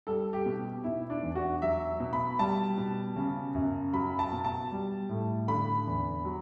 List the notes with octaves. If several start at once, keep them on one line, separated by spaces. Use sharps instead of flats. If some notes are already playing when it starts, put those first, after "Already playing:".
G3 A4
G4
B2
B2 E4
D4
E2
F#4
F#3 E5
B2
B5
G3 A5
B2
C#3
F#2
F#3 B5
A5
B2
A5
G3
A2
D3 B5
E2
F#3